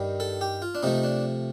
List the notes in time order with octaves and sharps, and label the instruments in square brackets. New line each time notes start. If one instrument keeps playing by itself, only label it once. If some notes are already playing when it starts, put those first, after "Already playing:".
Already playing: [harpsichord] G2 D#3 G3
A4
G4
F4
D4
C3 F3 A3 D#4
D4